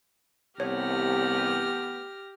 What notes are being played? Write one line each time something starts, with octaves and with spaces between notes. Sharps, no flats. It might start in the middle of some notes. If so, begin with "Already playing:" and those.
C2 E3 A3 B3 G4 C#5 F6 A#6